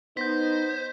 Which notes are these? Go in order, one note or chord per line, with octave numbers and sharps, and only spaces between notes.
B3 D#4 C5 G6 A#6 B6